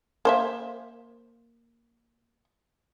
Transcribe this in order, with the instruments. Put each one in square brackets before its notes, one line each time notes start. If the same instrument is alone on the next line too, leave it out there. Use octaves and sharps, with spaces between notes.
[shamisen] A#3 C5 E5